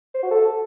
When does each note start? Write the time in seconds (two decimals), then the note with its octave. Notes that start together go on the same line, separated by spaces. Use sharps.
0.14 C5
0.23 F#4
0.31 A4